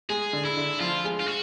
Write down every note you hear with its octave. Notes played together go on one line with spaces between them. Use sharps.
G#3 G#4
D3
E4
D3
F3 F4
G#3
F4
F#4